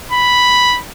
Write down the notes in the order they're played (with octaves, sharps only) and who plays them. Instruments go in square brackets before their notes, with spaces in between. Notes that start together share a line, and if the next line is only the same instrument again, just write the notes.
[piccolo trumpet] B5